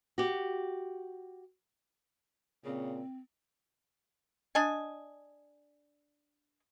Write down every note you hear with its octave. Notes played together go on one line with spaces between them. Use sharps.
F#4 G4
A#2 C#3 C4
D4 D#5 G#5